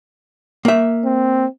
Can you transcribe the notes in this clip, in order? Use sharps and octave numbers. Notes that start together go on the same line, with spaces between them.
A#3 E5
C4